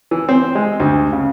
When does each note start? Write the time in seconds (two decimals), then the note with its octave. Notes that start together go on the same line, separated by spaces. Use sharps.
0.11 E3
0.29 C4
0.55 G#3
0.80 D2
1.13 C#3